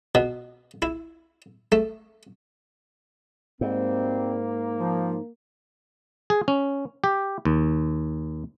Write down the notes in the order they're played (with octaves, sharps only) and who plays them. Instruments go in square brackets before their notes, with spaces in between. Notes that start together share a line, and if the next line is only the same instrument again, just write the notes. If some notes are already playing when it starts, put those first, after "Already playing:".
[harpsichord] B2
E4
A3
[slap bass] G#2 [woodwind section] G3 G#3 C4 [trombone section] A#3
[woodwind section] F3
[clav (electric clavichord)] G#4
C#4
G4
D#2